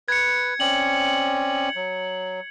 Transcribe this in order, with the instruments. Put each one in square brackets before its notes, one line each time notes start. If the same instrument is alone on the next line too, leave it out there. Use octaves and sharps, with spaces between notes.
[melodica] B4 [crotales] G#6 C#7
[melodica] C4 C#4 D5 [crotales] F#7
[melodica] F#3